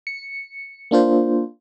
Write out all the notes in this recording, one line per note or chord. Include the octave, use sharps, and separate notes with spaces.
C#7
A#3 D4 F4 C5